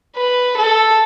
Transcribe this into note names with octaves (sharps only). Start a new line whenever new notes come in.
B4
A4